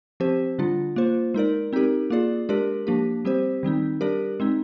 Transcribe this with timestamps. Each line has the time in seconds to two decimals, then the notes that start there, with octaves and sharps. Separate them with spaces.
0.20 F3 C4 G4 C5
0.58 D3 G3 D4 F4
0.96 A#3 F4 C5
1.34 G#3 D#4 A#4 D5
1.73 C4 D#4 G4 A#4
2.10 A#3 F4 G#4 D5
2.49 G#3 D4 G4 A#4 D5
2.87 F3 A#3 D4 G4
3.25 G3 C4 G4 C5
3.63 D#3 G3 C4 D#4
4.01 G3 D4 G4 A#4 D5
4.40 G#3 C4 D#4